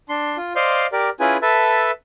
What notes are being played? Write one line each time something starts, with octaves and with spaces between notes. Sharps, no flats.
D4 C6
F4
C5 D5 D#5 F5 C6
G4 A#4 D5
C#4 E4 F4 G#4 B4 G#5
A4 B4 E5 A5